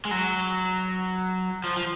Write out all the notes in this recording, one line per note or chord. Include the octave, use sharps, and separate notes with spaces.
G#3
F#3
F3
F3